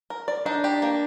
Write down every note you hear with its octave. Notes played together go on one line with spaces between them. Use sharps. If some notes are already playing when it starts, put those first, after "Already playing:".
A#4
D5
D4 D#4
G4
A#3